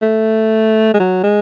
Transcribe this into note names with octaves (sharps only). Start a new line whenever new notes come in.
A3
G#3
F#3
G#3